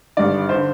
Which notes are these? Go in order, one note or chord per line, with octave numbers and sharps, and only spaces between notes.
G#1 G2 D3 D5
D3 C5